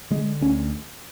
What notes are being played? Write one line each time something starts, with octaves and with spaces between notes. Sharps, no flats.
D3 G#3
D2 C#4